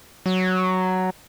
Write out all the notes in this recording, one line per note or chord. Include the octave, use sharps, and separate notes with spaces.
F#3